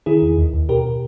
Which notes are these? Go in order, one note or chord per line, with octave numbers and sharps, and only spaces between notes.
D#3 E4 G#4
E2
D#2
D#2
B2 G4 A#4